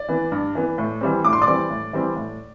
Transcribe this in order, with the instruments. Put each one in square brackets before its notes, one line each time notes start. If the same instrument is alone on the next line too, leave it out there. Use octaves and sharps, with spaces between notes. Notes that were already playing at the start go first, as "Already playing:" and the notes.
Already playing: [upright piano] D5
E3 B3
G2
E3 B3
A2
E3 G3 C4
A2 D6
C6
D5 D6
E3 G3 C4
A2
E3 G3 C4
A2